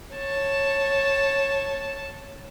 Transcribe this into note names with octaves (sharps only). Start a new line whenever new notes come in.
C#5 A5